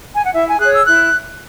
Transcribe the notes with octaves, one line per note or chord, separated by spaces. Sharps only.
G#5
F#5
E4 E5
G#5
G#4 C#5 F#6
E6
E4 F#6